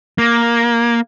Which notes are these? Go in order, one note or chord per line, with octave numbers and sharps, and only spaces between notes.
A#3